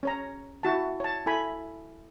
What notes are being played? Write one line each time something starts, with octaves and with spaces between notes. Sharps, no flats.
C#4 C#5 A#5
E4 F#4 A5
C#5 A5
E4 A4 G#5 B5